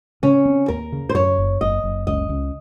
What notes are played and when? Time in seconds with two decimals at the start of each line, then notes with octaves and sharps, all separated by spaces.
0.23 C#3 C#4
0.46 C4
0.68 D#2 A#4
0.92 C#3
1.09 C5
1.14 F#2 C#5
1.38 F#1
1.61 F#1 D#5
1.83 F#1
2.07 C#2 D#5
2.29 C#2